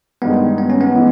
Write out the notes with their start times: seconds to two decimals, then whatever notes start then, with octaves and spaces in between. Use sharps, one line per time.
0.22 G2 D#3 G#3 B3 D#4
0.58 B3
0.70 C#4
0.81 B3
0.95 E3 G#3